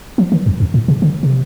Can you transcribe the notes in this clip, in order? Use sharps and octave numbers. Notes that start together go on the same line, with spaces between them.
F3
D#3
F2
F2
A2
C3
D3
C3